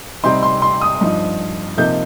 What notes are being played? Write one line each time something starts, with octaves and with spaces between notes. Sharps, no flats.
C3 G3 C4 D#4 C6
C6
C6
D#6
G2 F3 D#4
C3 F3 A#3 D#4 G6